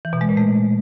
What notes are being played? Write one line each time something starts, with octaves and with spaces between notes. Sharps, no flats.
E3
B2
G#3
A#2
A3